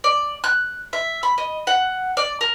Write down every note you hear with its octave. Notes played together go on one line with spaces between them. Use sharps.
D5
F#6
E5
B5
D#5
F#5
D5
A#4